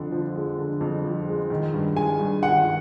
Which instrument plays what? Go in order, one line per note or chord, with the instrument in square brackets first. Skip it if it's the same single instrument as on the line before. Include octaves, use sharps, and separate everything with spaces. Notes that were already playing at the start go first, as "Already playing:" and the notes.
Already playing: [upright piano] F2 D3
F3
G#3
D3
F2
F3
G#3
D#3
G2
G#3 G#5
G2
D#3 F#5